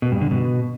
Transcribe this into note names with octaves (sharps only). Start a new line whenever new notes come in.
B2
G2
D3
B2